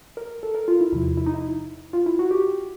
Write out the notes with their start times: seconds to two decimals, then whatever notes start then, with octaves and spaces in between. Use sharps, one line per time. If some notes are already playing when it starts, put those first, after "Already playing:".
0.17 A#4
0.43 A4
0.55 A#4
0.68 F4
0.81 E4
0.92 E2 C3 F3 E4
1.17 E4
1.26 D#4
1.34 E4
1.93 F4
2.06 E4
2.19 F#4
2.31 G4